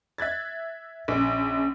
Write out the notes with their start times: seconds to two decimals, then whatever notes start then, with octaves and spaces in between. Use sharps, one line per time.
0.18 E5 F#6 G#6 A6
1.08 A#1 C#3